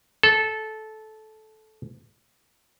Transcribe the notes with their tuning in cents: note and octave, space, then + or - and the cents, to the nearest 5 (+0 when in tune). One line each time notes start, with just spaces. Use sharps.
A4 -15